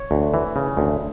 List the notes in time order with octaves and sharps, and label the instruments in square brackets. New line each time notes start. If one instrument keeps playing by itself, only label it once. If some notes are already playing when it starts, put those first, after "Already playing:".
Already playing: [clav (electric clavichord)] C#5
D2
E3
C#3
D2